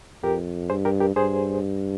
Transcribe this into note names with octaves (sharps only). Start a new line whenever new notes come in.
F2 G4 A#4
G2 G#4 C5
G4 A#4
G4 A#4
G2 G#4 C5